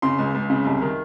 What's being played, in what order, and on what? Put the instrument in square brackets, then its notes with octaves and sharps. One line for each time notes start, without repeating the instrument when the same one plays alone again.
[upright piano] C#3 C6
C#2
C#2
C#3
C2
D#3